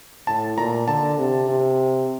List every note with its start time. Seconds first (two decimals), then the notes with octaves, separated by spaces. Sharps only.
0.27 A2 A5
0.57 A#2 A#5
0.87 D3 A5
1.18 C3
1.49 C3